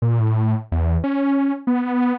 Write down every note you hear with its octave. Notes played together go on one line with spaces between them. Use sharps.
A#2
A2
E2
C#4
B3